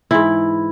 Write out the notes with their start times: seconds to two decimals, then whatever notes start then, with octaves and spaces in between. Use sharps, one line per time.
0.11 G#2 E3 E4